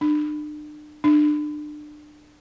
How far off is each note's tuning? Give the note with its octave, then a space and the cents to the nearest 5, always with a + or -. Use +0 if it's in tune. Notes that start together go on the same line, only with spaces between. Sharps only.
D4 +40
D4 +30